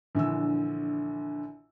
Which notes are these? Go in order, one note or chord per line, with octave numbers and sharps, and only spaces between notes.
A#1 D3 E3 E6